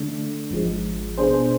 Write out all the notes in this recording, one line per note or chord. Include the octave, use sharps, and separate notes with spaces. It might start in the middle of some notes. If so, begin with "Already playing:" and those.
Already playing: D3 A3 D4
G#1 G#2 F3 G#3
B2 B3 D4 G#4 C5